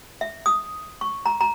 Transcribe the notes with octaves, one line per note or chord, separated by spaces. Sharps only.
E5
D#6
C#6
A#5
A#5